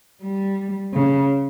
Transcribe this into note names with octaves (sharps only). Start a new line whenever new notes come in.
G3
C#3